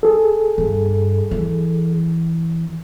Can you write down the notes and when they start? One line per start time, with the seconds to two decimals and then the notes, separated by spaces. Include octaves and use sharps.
0.03 G#4 A4
0.58 G2
1.31 E3